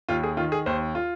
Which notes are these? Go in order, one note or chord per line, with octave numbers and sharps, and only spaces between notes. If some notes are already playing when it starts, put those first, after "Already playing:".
D#2 F4
G#4
D#3 F4
G#4
D#2 C5
F4